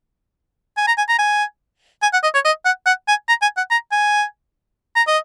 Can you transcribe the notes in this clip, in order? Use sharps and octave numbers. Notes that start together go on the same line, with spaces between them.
G#5
A#5
G#5
A#5
G#5
G#5
F#5
D#5
C#5
D#5
F#5
F#5
G#5
A#5
G#5
F#5
A#5
G#5
A#5
D#5